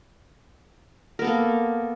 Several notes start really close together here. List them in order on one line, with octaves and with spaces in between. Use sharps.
A#4 B3 A4 A#3